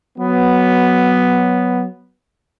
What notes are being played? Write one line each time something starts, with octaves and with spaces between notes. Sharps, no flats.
F#3 B3